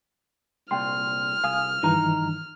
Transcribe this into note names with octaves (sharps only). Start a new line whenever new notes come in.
C2 A#2 G5 C6 F6
C2 F5 G#5 D#6
G2 D#3 E3 D#4 A#5